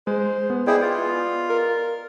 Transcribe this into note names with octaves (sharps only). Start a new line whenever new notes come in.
G#3 C5
B3
B3 E4 G#4 D5 D#5 G5
F4
A#4